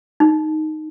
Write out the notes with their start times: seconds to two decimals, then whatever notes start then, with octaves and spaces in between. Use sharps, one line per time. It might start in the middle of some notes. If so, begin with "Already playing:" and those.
0.20 D#4